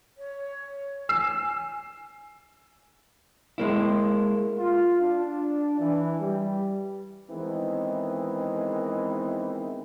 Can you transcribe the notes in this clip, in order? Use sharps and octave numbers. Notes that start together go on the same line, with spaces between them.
C#5
G#5 E6 C7
G#3 A#3 E4
F4
D4
E3
G3
D#3 E3 G#3 B3 C4